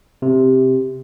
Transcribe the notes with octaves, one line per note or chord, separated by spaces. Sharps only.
C3